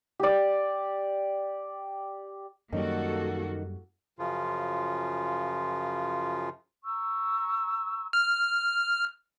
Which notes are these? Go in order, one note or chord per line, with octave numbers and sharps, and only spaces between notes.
G4 D5
F#2 D#3 F#3 G3 A#3 F#4 A4
F#2 C#3 F3 F4
A#5 C#6 E6
F6